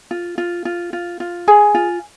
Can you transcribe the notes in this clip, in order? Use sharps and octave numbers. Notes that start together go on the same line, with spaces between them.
F4
F4
F4
F4
F4
G#4 G#5
F4